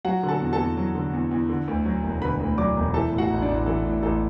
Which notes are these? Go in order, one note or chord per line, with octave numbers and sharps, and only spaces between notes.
F#3 F#4 F#5
D3
A4 A5
E2
A4 A5
E2
F#3
D3
E2
E2
D3
D2
F#3
E1
D3 B4 B5
D2
F#3 D5 D6
E1
E3 A4 A5
A2
F#4 F#5
A1
D4 D5
A1
E3 A4
A2
A1 A4